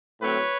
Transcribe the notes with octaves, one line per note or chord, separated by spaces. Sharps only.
A2 F#3 A3 C4 B4 C#5